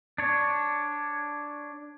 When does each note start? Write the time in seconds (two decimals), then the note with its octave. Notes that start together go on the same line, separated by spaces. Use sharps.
0.18 D4 C#5